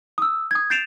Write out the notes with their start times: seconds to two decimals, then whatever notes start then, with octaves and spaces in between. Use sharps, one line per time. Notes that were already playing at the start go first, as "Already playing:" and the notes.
0.18 D#6 E6
0.51 D#6 G#6
0.70 G6 A6 C7 D7 E7 F7